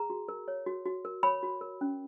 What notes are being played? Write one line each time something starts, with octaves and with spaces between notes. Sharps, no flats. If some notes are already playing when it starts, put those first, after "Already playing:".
Already playing: G#4 A#5
F#4
A#4
C#5
F#4
F#4
A#4
C#5 B5
F#4
A#4
C#4